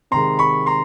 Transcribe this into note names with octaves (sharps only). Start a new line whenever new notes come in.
C3 D#3 G#3 A#5 C6
B5 C#6
A#5 C6